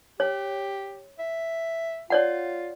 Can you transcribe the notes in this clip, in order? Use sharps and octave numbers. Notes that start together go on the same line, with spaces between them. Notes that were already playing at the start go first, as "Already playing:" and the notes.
G4 C#5
E5
F4 C#5 D5 F#5